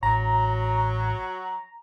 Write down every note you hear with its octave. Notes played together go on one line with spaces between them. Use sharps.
A1 F#3 A#5